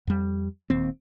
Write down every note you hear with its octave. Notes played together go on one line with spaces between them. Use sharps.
F2 G3
D#1 D#2 C4